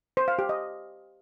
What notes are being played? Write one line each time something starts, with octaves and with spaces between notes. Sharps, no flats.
C5
F5
G4
D#5